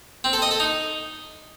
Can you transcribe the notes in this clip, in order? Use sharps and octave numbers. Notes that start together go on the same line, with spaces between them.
C4
A4
D#5
A4
D#4